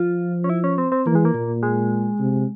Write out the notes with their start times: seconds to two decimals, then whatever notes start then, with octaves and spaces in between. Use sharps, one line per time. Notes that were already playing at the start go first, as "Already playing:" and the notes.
Already playing: F3 F4
0.44 C#4
0.49 E4
0.64 C#4
0.78 C4
0.92 C4
1.06 E3 A#3
1.15 G#3
1.25 A#3
1.34 A#2
1.63 G#3
2.19 C3